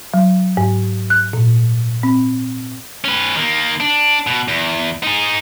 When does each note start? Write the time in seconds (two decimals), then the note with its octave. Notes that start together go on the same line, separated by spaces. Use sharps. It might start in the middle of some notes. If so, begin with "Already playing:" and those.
0.14 F#3
0.57 G#2
1.10 F#6
1.33 A#2
2.03 C4
3.04 C#4 B4
3.36 D#3 A#3
3.80 D4
4.27 B2
4.48 E2
5.03 D#4 G#4